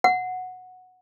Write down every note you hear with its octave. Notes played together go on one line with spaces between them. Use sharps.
F#5